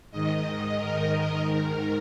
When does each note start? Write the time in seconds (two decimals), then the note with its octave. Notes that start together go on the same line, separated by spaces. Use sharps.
0.11 G#2 D#3 D#5
0.43 D#5
0.76 A#4
1.42 G#2 D#3